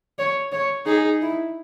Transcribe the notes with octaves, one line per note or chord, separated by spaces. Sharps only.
C#5
C#5
D#4 G#4
E4